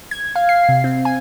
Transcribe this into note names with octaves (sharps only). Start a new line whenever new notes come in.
G#6
F5
C7
C3
C4
G#5